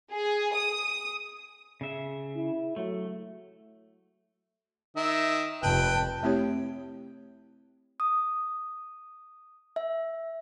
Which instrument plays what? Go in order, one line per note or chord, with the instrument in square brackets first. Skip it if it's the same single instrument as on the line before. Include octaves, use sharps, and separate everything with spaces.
[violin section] G#4
D#6
[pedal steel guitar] C#3 E5
[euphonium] E4
[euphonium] F#3 [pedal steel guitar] A3
[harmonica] D#3 E5
[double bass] F1 [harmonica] B4 G5 [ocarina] A5
[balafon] A3 C4 E4 G4 C#5
[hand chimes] D#6
E5